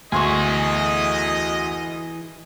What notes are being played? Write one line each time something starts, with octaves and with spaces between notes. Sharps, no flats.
D2 E3 G#4 D#5 C6 C#6